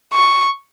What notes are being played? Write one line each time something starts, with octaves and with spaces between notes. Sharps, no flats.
C#6